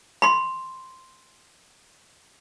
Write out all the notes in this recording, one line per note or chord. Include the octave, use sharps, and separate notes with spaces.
B5 C6